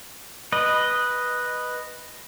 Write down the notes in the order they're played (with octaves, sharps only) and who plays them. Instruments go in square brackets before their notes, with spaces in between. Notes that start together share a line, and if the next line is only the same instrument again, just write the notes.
[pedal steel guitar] B4 D#5